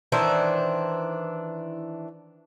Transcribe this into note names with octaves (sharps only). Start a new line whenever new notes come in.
D#3 E3 D4 C5